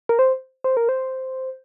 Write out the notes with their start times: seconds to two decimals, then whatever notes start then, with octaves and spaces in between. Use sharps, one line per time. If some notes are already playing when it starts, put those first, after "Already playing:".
0.09 A#4
0.19 C5
0.64 C5
0.77 A#4
0.89 C5